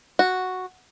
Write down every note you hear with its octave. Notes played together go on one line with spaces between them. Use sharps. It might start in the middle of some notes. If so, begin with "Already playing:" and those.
F#4